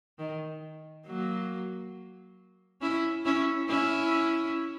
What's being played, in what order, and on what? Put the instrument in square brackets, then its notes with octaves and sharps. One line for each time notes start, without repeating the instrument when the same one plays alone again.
[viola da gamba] D#3
F#3 A#3
C#4 E4
C#4 E4
C#4 E4